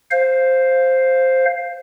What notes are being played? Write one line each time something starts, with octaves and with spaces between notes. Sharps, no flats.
C5 F5